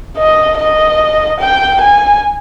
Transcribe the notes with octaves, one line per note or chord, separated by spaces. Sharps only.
D#5
D#5
G5
G#5